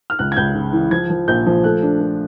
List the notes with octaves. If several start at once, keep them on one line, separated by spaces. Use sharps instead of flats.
F6
C#2 F#6
G#6
C#2 G6
C#3
E3
F3 G#6
F3
A#1 G6
F3
A3 F#6
D4
A3